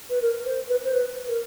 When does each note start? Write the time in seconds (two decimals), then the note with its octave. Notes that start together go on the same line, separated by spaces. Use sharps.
0.10 B4
0.22 A#4
0.45 C5
0.69 B4
0.85 C5
0.93 B4
1.28 A#4